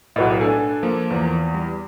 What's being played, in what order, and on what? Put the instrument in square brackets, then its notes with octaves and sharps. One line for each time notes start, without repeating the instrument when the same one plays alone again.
[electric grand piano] B1 A2 [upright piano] F#4 B4 D5
[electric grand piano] D4 G#5 [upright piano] A4
[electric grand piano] F3 A#3
[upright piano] E2
[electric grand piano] G3